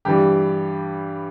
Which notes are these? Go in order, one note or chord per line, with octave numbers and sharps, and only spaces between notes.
G2 E3 G3 G4